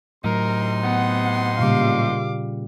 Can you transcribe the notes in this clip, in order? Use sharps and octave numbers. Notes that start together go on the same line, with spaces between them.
A2 C3 F#3 D#4 A#4 C6
B3 F#5
A#2 C#3 G3 F5 D6